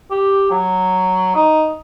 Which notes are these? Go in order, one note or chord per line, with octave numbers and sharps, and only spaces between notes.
G4
F#3
D#4